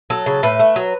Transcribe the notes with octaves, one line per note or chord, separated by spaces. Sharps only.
F#3 A4
C#3
A2 B4
A3
F#3